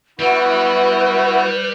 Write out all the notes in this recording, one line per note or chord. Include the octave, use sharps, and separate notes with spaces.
G3 B3 E4 F#4 B4